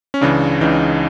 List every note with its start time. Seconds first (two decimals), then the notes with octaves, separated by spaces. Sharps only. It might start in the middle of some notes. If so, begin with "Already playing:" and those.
0.14 C#4
0.21 C#2 C#3 E3 D4
0.61 C#2 C#3 E3 D#4